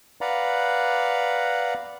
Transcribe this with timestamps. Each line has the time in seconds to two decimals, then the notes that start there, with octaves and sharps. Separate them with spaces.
0.21 B4 D5 F5 F#5 A#5 B5